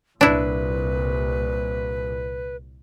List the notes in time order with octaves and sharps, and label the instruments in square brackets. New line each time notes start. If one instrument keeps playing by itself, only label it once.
[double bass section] C2 A#2 [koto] D4 E4 [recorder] B4